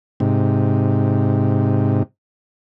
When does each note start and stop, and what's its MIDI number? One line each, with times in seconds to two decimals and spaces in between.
0.20 2.03 44
0.20 2.03 48